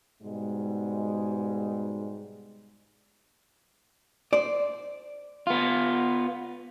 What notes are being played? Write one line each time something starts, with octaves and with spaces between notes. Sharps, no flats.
G#2 B2 G3 G#3
C5 D5
B3 F4